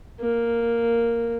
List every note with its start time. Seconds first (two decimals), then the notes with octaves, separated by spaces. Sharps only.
0.20 A#3